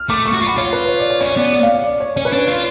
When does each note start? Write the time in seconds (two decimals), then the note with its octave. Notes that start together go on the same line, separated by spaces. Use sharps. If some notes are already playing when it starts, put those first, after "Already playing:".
Already playing: F6
0.09 A3 D6
0.26 C#6
0.33 F#4
0.36 C#6
0.42 F4
0.47 F#4 B5
0.57 F4 C#5
0.73 B4
0.89 C#5
1.00 D5
1.10 C#5
1.21 C#4 C#5
1.31 C#5
1.37 B3 D5
1.53 D5
1.63 F5
1.74 D5
1.84 D5
2.00 C#5
2.16 C#4 C#5
2.25 B4
2.33 D4 C#5
2.48 F4